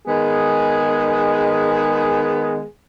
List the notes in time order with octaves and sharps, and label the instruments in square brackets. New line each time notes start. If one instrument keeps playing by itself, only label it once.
[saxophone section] D#3 G#3 B3 G#4